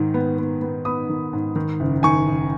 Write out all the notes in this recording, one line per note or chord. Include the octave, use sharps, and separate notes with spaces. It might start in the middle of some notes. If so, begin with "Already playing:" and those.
Already playing: G#2 D#3
B3
B3
B3
B3 B5 D#6
D#3
G#2
D#3
F#1
D#3 G#5 C#6
F#1